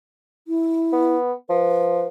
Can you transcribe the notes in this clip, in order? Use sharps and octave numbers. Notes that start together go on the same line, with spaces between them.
E4
B3
F3 B4